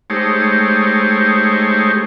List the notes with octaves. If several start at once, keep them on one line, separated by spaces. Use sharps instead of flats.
G#3 A3 D#4 G4 C5 C#5